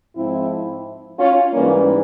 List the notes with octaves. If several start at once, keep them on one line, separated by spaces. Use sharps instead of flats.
G#2 F3 C4 E4
C#4 F4
G#2 E3 G3 A#3 C#4